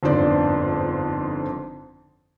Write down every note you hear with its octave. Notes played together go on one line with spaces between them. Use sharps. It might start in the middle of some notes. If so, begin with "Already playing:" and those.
G1 F2 G#2 D4 C5 D5